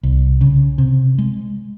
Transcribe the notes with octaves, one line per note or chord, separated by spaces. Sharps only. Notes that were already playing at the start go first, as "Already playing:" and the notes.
C2
C#3
C3
G#3